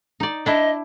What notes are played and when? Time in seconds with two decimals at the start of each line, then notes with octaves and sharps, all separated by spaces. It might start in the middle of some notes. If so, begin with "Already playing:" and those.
0.20 D#4 D5
0.46 D4 E4 D#5